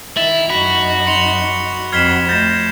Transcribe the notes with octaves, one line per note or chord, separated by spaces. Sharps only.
D#3 E4 A6 F7
F#2 D#4 F#4 B5 B6
C6 C#7 F7 G7
F2 F6 G#6 B6 C7 E7 G7
A3 G6 A6 A#6 E7